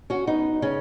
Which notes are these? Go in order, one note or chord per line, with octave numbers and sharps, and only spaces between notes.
C#4 F#4
B3 D#4
C#3 C#4